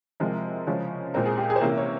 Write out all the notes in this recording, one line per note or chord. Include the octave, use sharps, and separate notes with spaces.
C3 F3 G#3 C4 A#4
C#3 F3 G#3 C#4
A#2 G#3 C4 A#4
G#4
G4
G#4
C5
C3 E3 A#3 C#4 A#4
C#5